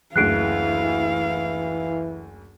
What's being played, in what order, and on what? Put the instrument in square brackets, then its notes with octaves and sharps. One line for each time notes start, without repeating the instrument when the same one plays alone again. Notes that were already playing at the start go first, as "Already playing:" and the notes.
[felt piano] F#1 D2 [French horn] E3 [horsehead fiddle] E4 F5 [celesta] F#6 C7 D7